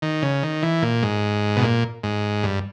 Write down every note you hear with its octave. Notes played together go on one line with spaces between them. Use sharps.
D#3
C#3
D#3
E3
A#2
G#2
B2
A#2
G#2
G2